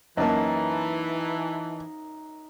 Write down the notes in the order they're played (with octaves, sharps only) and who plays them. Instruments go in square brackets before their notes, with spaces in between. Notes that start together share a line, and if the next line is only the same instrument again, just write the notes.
[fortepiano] F#2 A#3 [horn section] E3 [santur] D#4 [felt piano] D#5 A5